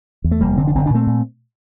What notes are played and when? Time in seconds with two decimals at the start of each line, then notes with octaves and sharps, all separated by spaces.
0.24 E2
0.31 A3
0.41 F1 G3 A#3
0.57 D3 C4
0.67 D4
0.75 F1 C4
0.86 D4
0.90 A#2 A3 C4
1.07 A#2